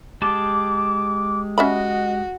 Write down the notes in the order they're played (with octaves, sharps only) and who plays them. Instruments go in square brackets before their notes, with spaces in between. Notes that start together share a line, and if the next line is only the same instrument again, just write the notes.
[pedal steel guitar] G#3 G4 A5 [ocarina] D6
[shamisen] C#4 E5 B5 [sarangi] F#4 [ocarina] D#5